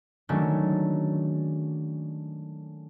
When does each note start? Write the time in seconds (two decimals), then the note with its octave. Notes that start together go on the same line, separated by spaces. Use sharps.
0.29 D#3 F#3 G#3 A3 C#4 D4